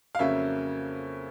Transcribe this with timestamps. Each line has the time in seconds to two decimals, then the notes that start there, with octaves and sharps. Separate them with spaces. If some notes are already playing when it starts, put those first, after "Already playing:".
0.15 F5
0.19 F2 C#3 F#3 A#3 C#4 E5